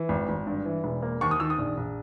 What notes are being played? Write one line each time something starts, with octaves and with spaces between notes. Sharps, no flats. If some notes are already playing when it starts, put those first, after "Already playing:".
Already playing: E3
G#1
G#1
G2
E3
E1
A#3
D#2 C#6
D#6
D#3 E6
D#6
A#1
A#1